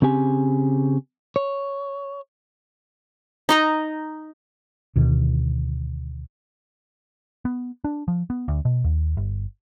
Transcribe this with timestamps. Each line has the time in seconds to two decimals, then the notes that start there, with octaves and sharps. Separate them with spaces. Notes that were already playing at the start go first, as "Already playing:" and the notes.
0.02 C#3 C4 G4 G#5
1.36 C#5
3.49 D#4 D#5 A#5
4.96 D2 B2 D#3
7.45 B3
7.84 D4
8.08 F3
8.30 B3
8.48 D2
8.65 B2
8.84 D#2
9.17 G1